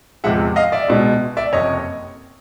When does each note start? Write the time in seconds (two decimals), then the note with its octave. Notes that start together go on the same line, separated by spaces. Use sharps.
0.24 E2 C3 F3 G#3 E5 F#5
0.56 D#5 F5
0.72 D5 E5
0.88 C#2 B2 G#3
1.37 D5 E5
1.53 F#1 F2 C3 C#5 D#5